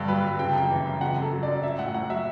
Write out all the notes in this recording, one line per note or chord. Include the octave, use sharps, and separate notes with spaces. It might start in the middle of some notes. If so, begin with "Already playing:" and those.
Already playing: G2 D3
F#3 B4
G2
C#3 G5
A5
F#2 G5
E3
F#2
C#3 F#5
F#2 A4
F#3
D5
F#2
F#3 E5
A2 F#5
A2 F#5
F#3 E5